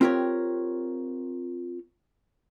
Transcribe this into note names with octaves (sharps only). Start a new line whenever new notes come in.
C4 F4 G4 A#4 C#5